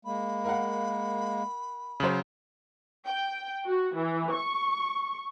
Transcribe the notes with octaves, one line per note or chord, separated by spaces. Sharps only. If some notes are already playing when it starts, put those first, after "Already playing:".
G#3 A#3 B5
A#4 F5 F#5
C#3 F#3 C5 F#7
G5
F#4
E3
C#6